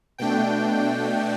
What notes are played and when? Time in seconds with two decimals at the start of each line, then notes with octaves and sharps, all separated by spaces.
0.18 B2 A3 D4 G5